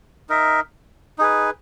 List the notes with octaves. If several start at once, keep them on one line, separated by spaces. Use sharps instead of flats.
D#4 A#4 E5
D#4 G#4 B4